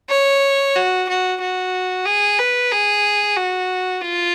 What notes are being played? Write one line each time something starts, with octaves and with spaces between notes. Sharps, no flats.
C#5
F#4
F#4
F#4
G#4
B4
G#4
F#4
F4